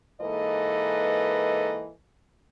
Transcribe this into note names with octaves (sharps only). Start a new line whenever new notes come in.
G#2 E3 A#3 A4 B4 D#5